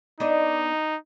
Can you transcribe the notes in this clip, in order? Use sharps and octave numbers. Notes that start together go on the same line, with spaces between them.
B3 D4 D#4 D#5